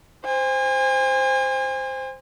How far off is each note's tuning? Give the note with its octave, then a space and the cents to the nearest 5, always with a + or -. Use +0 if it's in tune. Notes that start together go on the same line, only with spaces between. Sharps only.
C5 -5 G#5 -40